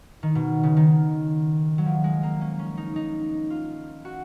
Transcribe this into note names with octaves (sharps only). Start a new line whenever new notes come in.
D#3
B2
C#3
D#3
F#3
F3
G#3
A#3
C#4
C#4
D#4
D#4
F4
F#4